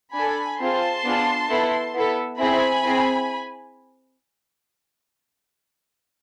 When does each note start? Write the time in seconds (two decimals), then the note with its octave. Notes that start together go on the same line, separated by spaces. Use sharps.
0.14 D4 A4 G#5 B5
0.59 C4 F4 G#4 A5 C6
1.04 B3 D4 F4 G#4
1.49 B3 E4 A4
1.94 B3 E4 A4
2.39 C4 E4 G#4 G#5 B5
2.84 C4 E4 G#4